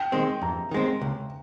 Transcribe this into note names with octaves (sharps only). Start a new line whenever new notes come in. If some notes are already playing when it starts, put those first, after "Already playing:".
Already playing: G5
D#3 G#3 C4
F2 A#5
D#3 G#3 C4
C#2